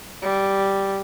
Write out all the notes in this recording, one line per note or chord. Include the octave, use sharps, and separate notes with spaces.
G3